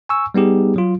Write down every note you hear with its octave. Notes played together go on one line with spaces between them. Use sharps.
G#5 C#6 E6
G3 B3 D#4 G4 G#4
F#3 F4